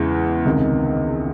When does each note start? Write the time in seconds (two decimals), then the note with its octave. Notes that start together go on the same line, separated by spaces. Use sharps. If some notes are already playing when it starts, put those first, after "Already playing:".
Already playing: E2 C#3 E3 G#3
0.45 C#2 C3 D#3